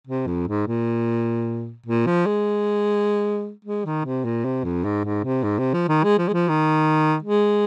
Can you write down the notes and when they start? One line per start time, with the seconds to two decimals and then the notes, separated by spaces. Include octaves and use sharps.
0.07 C3
0.27 F2
0.48 G#2
0.67 A#2
1.86 A#2
2.06 F3
2.26 G#3
3.65 G#3
3.85 D#3
4.05 C3
4.25 A#2
4.45 C3
4.64 F2
4.84 G#2
5.05 G#2
5.24 C3
5.44 G#2
5.59 C3
5.74 F3
5.88 D#3
6.03 G#3
6.18 F3
6.28 G#3
6.33 F3
6.48 D#3
7.23 G#3